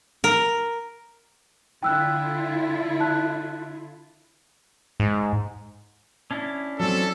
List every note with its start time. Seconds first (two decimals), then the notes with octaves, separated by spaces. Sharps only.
0.24 A#4
1.83 D3 E4 F4 G5 E6 F#6
3.00 A5 F#6
5.00 G#2
6.31 C#4 D4 E4
6.79 F#3 C4 A4